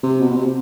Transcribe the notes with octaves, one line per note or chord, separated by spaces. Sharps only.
C3
B2
B2
C3